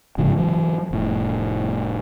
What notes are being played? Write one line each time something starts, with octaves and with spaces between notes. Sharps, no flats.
G1 G#2 C#3 F3
E3 F#3
F1 A2